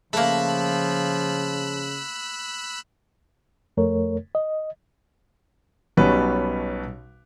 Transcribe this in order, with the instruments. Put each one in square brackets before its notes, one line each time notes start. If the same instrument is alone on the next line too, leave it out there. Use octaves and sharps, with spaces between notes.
[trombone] C#3 [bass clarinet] F3 [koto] A3 A#3 [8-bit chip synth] B5 E6 F#6
[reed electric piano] F2 A3 A#4 C#5
D#5
[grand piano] B1 B2 G3 B3 C#4 B4